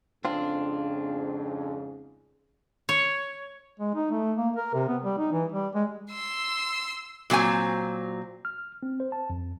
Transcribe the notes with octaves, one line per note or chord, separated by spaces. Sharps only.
F2 G#2 C#3 C4 D4 F4
C#5
G#3
D#4
A3
A#3
A#4
C3
B3
G3
D#4
E3
G3
G#3
C6 E6
A#2 F#3 C4 G#5
F6
C4
C5
A5
F2